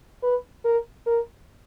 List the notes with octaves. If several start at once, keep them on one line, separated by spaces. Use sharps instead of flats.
B4
A#4
A#4